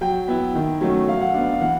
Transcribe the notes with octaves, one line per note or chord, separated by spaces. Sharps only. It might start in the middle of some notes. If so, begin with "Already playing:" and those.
F#3 G5
B3 E4
D#3
F#3 A3 C#4
F#3 F5
F#5
B3 D4 F5
F5
E3 F#5